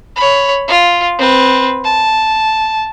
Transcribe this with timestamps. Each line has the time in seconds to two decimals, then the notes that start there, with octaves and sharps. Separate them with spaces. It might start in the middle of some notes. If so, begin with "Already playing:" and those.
0.16 C#5 B5
0.68 F4
1.18 C4 B4
1.85 A5